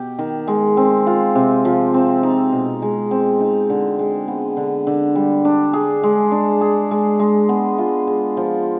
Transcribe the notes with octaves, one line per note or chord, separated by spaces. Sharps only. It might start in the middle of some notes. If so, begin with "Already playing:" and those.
Already playing: B2 G4
D#3
G#3
C4
F4
C3
F3
C4
D#4
B2
G#3
C4
D#4
D3
G#3
B3
D3
D3
G3
D4
G#4
G#3
D4
G#4
G#3
G#3
B3
F4
G#4
F3